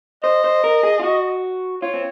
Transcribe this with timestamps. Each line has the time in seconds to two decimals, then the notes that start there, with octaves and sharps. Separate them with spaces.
0.23 C5 D#5
0.44 C5
0.64 A#4
0.83 G#4
0.99 F4
1.03 F#4
1.82 F4 C#5
1.94 C4